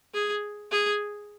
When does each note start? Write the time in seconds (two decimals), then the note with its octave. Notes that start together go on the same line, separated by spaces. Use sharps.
0.14 G#4
0.71 G#4